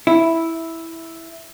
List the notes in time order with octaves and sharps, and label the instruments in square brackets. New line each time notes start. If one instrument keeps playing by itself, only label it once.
[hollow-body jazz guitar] E4